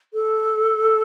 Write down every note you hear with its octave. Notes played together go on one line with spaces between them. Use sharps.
A4